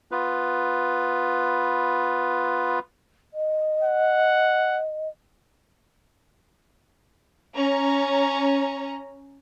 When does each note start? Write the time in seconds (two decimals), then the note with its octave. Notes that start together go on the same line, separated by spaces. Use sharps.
0.12 B3 F4 B4
3.34 D#5
3.83 F#5
7.55 C#4 A#5